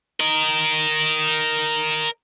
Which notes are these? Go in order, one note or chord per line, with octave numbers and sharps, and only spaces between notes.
A#4 D#5